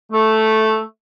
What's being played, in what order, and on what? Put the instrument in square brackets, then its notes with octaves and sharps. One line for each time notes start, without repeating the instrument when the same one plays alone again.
[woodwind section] A3